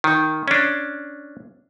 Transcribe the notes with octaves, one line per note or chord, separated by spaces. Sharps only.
D#3
C#4 D4